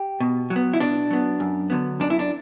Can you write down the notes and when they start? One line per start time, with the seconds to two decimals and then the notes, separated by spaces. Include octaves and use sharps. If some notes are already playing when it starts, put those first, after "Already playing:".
Already playing: G4
0.20 B2
0.50 F#3
0.56 B3
0.73 E4
0.80 B2 D4
1.10 F#3 B3
1.40 F#2
1.70 D3 F#3 B3
2.00 F#2 D4
2.10 E4
2.19 D4